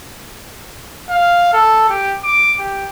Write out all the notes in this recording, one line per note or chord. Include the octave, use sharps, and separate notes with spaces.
F5
A4
G4
D6
G4